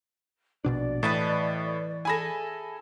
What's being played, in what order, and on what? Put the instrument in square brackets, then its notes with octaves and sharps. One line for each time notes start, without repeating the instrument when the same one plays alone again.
[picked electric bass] A#1 B2 D4 [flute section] D5
[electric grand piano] A2 [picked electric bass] E3 [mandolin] B4 D#5 A5
[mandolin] E4 G#4 A4 [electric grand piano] G#5 B5 A#6